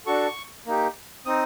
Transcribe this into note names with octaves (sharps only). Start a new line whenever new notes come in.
D4 F#4 A4 C#6
A#3 D#4 G4
C4 D#4 D#6